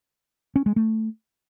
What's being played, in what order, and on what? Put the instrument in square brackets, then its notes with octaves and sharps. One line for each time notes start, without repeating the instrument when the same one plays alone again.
[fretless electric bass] C#4
G#3
A3